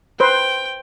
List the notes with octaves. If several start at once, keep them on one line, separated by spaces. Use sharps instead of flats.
B4 C5 G5